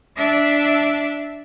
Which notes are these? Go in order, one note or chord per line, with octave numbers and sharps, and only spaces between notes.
D4 E5